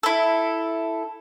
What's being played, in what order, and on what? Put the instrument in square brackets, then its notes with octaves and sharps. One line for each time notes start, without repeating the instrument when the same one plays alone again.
[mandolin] E4 A4